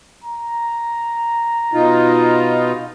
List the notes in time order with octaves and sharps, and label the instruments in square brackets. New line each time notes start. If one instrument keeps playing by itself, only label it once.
[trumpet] A#5
[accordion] B2 D#4 F4